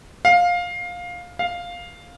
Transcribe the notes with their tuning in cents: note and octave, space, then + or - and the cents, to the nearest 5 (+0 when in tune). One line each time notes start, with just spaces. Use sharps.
F5 +15
F5 +5